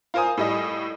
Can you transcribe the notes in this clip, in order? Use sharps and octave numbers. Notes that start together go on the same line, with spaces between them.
F4 A#4 C5 G#5 D#6
A2 G3 D#5